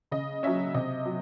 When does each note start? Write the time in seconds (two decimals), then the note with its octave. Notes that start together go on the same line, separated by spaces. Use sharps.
0.11 C#3 D#5
0.43 F#3 C#4 E5
0.74 C3 D#5
1.06 F#3